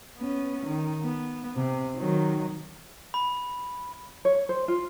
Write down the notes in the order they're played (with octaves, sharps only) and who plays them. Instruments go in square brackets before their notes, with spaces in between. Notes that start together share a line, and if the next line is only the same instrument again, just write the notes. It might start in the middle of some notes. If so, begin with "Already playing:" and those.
[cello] B3 C#4
D#3
B3
C3
D#3 F#3
[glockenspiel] B5
[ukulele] C#5
C5
F4